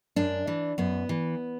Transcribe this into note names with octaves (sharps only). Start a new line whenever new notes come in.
F#2 D4
E3
F#2 B3
E3